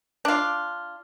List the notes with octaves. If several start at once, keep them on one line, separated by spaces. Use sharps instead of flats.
D4 F4